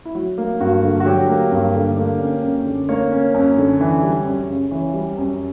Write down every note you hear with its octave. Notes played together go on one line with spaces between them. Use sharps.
E4
F#3 F#4
A#3
G2 F#4
D3
F#4
F#3 G4
A#3
G2
D3
A#3
C#4
F#2
D3
A#3 C#5
C#4
F#2
D3
E3
G3
F#2
C#3
E3 C#5
G3
F#2